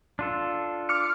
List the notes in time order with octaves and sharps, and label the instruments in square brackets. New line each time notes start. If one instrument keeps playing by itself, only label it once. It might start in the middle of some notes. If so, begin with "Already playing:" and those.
[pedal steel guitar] D4 F4 A4
[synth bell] D6 F6 C#7